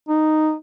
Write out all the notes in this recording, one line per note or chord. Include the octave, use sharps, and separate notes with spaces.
D#4